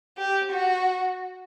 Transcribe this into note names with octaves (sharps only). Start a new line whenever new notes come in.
G4
F#4